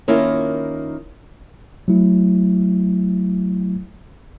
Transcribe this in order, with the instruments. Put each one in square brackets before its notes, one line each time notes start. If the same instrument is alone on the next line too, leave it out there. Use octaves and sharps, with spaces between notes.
[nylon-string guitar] D#3 A#3 C#4 E4 F4
[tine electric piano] F#3 A3 E4